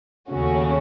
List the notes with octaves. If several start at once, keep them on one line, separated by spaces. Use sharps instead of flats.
D#2 C#3 A3 C#4 F#4